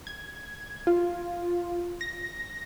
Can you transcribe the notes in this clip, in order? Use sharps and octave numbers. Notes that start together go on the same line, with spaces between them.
G#6
F4
A#6